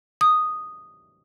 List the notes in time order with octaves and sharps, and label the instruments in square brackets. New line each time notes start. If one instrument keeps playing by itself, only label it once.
[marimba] D#6